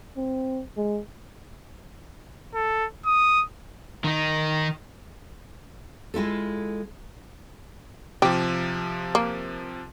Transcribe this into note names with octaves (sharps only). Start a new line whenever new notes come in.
C4
G#3
A4
D#6
D#3 D#4
G#3 E4 F4 A4
C3 F3 G4
A#3